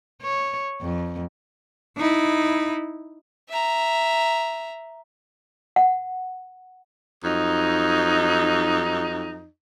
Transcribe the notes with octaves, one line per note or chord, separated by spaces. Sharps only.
C#5
F2
D#4 E4
E5 A#5
F#5
F2 F#3 D#4